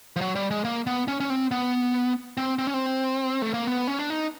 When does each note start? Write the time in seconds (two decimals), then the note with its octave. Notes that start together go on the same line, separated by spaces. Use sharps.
0.16 F3
0.21 F#3
0.35 G3
0.51 G#3
0.65 A#3
0.87 B3
1.08 C#4
1.20 C#4
1.30 C4
1.51 B3
2.37 C4
2.59 C4
2.67 C#4
2.74 C4
3.42 A3
3.54 A#3
3.67 B3
3.88 C#4
3.99 D4
4.10 D#4